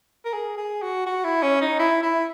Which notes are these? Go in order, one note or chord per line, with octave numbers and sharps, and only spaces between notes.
A#4
G#4
G#4
F#4
F#4
E4
C#4
D#4
E4
E4